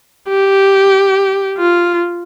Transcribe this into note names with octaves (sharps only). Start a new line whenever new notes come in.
G4
F4